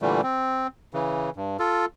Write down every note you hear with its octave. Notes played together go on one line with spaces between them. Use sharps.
A#2 D3 E3 G3 A3
C4
C#3 E3
G2
F4 A4